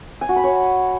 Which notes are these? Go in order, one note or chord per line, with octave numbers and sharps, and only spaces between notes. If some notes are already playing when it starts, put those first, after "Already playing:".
G#5
F#4
B5
C#5